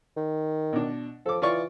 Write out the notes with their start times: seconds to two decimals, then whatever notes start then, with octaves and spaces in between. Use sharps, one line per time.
0.17 D#3
0.73 B2 D4
1.26 F3 A4 D6
1.42 E3 F4 D5 C#6